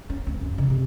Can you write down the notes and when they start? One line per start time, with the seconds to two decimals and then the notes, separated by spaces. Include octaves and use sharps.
0.10 C#4
0.27 D2
0.41 F#2
0.58 C#3
0.70 C3